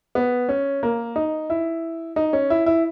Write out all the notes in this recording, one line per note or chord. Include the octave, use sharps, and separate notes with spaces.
B3
C#4
A#3
D#4
E4
D#4
C#4
E4
E4